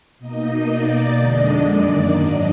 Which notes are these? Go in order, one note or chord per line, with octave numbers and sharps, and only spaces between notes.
B2 A#3 D#4 D#5
B2 A#3 D#4 D5
F2 D3 G#3 D4 D#5
F#2 D#3 A#3 D5
G#2 F#3 D4 D#5